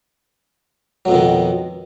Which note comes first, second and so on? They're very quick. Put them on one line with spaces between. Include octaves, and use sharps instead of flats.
F#3 F2 B2 D#3